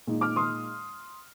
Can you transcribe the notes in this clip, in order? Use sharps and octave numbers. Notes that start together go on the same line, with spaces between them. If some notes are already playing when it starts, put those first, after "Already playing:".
A#2 G#3 D#4
D6 F6
C6 D#6